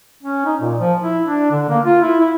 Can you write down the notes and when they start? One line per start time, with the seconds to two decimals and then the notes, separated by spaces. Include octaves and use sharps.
0.23 C#4
0.46 D#4
0.61 A#2
0.79 F3
1.02 E4
1.24 D4
1.51 D3
1.69 A#3
1.85 F4
2.01 E4
2.20 E4